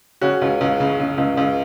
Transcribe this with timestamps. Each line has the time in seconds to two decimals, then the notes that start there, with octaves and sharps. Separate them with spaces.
0.21 C#3 C#4 F#4
0.42 C#2
0.61 C#2
0.80 C#3
1.00 C#3
1.18 C#2
1.37 C#2